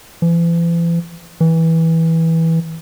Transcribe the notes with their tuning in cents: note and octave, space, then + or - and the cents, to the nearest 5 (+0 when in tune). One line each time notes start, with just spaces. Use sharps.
E3 +40
E3 -15